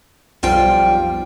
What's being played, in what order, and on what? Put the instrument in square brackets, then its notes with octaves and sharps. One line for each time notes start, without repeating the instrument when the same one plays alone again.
[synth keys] B1 F4 [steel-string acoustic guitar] F2 G3 G5